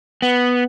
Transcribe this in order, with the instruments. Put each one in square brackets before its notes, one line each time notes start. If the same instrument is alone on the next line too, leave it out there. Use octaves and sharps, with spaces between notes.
[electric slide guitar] B3